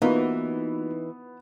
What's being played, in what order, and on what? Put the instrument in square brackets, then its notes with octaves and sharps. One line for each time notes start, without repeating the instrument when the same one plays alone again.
[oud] E3 [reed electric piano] A#3 F4 F#4 [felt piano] B3 [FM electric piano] D#4